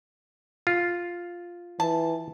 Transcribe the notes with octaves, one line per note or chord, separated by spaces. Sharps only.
F4
E3 A5